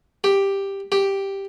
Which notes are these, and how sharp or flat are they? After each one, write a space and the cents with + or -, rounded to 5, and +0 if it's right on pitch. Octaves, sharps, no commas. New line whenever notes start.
G4 +5
G4 +0